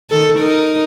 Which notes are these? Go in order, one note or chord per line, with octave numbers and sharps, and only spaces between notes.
D#3 A4
D#4 A#4